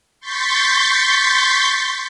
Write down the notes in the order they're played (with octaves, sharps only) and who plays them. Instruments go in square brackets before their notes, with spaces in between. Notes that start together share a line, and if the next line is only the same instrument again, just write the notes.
[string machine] C6 C#6 G6 A6 B6